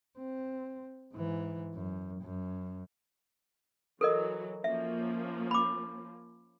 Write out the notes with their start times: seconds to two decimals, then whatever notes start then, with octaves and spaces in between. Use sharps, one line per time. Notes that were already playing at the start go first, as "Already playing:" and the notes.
0.18 C4
1.14 G#2 E3
1.74 F#2
2.22 F#2
4.01 E3 F#3 A4 A#4 D#5
4.64 F3 A#3 C#4 E5
5.51 B5 D6